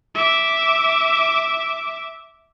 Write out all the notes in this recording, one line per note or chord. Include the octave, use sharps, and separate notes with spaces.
E5 D6